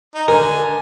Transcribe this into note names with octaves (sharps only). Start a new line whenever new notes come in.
D#4
D3 A#4 G#5